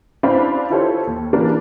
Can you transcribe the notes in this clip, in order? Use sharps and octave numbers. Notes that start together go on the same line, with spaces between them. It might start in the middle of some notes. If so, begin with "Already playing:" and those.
C4 D4 E4 F5 B5
E4 F4 G4 A4 C5 C#5
D#2
E3 A#3 D4 A#4 B4